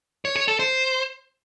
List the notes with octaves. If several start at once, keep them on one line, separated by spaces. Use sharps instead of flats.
C#5
C#5
A4
C5